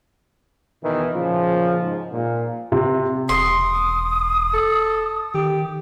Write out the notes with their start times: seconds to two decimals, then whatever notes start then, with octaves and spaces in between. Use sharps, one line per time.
0.82 E2 B2 D#3 E3
1.13 A#2 C#3 F3
1.82 G#2
2.11 A#2
2.72 C3
3.29 E1 C6 D#6
4.54 A4
5.34 D#3 G4